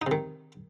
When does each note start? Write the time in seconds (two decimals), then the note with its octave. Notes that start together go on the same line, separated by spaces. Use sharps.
0.02 D#4
0.07 C3
0.11 D#3